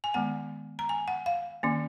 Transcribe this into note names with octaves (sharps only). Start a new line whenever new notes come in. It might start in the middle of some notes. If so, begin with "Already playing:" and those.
G#5
D#3 G#3 B3 F#5
A#5
G#5
F#5
F5
D#3 A#3 C#4